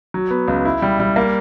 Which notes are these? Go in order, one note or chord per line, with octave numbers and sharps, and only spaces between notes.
F#3
B3
C#2
E4
G3
G3
A#3